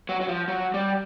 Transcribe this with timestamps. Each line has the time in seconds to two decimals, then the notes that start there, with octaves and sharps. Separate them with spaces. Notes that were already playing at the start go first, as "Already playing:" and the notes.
0.09 F#3
0.21 F#3
0.28 F3
0.48 F#3
0.74 G3